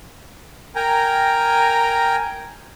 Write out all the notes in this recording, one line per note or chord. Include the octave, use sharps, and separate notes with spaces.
A#4 G5 G#5 A#5